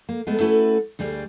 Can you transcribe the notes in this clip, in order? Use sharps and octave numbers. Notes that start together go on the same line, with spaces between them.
A#3
G#3 A3 B3
A3 C#4 E4 F#4 A4 B4
D2 G3 G#4 D5